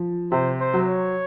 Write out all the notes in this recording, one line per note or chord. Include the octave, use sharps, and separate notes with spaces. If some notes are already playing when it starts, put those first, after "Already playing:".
Already playing: F3
C3 C5
C5
F#3
C#5